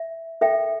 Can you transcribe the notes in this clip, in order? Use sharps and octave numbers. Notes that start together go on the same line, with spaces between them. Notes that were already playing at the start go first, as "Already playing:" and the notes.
Already playing: E5
A4 E5 G5